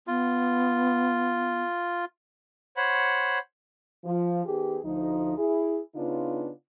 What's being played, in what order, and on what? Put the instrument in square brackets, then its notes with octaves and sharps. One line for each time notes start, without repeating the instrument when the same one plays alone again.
[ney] B3 [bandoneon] F4
[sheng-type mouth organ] C5 C#5 F#5 B5
[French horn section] F3
D#3 B3 G4 G#4
D2 F3 D#4
E4 G#4
C#3 B3 D4 D#4 F4